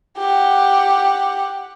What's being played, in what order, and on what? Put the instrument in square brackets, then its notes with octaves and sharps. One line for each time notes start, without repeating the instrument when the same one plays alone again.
[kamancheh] G4 F#5